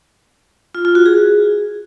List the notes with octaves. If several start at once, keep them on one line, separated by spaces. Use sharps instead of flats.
F4
F4
F#4
G#4